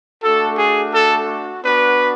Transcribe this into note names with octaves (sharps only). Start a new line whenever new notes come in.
A3 D4 F#4 A4
G#4
A4
B3 D4 F#4 B4